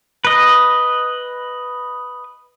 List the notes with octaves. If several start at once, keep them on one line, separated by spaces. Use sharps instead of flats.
B4 D#5